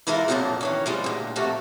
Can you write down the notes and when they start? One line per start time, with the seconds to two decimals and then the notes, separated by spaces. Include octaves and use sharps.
0.07 E3 G#3 E4 F4 A#4
0.28 F2 A#2 C#3 F3 F#3 D4
0.61 D#3 E3 C#4
0.86 F3 G3 G#3
1.04 D2 A#2
1.36 C3 F3 A3 A#3 F#4